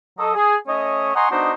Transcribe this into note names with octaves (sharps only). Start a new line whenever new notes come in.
F#3 A4 D#5
G#4
A3 C#4 C#5 D#5
D#5 F#5 G#5 A#5 C6 C#6
B3 D4 D#4 F#4 C5 D#5